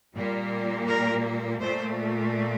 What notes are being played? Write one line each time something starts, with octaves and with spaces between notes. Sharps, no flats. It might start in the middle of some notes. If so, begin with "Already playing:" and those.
A#2 G3 A#3
A#4
A#2 A3 C5